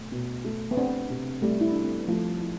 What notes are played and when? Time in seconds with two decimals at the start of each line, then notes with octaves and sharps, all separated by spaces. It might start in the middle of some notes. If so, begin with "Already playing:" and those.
Already playing: B2 A3
0.12 B2
0.44 A3
0.71 B3
0.77 C4 D4
1.10 C3
1.42 G3 A3
1.61 E4
1.72 D4 A4
1.84 C4
1.96 B3
2.08 F3 A3
2.41 E4